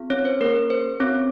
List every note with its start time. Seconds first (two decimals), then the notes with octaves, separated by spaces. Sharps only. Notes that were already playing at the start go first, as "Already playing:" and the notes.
Already playing: C4 F4 G#4
0.10 C#4 C#5
0.25 C5
0.41 A#3 C#4 G#4 A#4
0.70 C5
1.00 C4 C#4 F#4 C#5